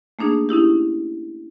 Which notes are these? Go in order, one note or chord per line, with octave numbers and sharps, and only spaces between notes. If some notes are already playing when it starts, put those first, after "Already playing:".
A3 A#3 D4 D#4 G#4
C#4 D#4 E4 G4